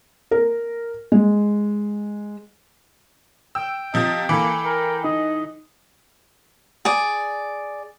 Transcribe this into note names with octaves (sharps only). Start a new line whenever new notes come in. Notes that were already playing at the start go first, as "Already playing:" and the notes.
A#4
G#3
G5 E6
C3 F3 D#5
E3 A#3 A4 G#5 B5 D6
A#4
D#4 D#5
G#4 D5